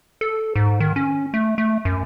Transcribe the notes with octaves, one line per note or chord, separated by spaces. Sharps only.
A4
G#2
D#3
C#4
A3
A3
F#2